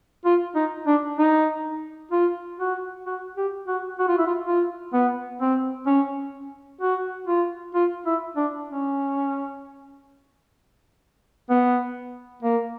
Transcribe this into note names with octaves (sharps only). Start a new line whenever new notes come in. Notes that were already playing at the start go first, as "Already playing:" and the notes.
F4
D#4
D4
D#4
F4
F#4
F#4
G4
F#4
F#4
F4
E4
F4
F4
B3
C4
C#4
F#4
F4
F4
E4
D4
C#4
B3
A#3